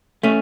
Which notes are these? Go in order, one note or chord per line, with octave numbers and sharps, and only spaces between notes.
A3 C#4